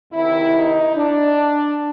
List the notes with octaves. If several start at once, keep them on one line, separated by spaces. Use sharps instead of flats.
E2 C3 D#3 E4
D#4
D4